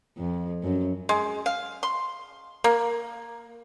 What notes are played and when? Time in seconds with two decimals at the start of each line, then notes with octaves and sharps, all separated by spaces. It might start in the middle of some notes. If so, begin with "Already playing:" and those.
0.17 F2
0.63 F#2
1.09 G#3
1.46 F5
1.83 C6
2.64 A#3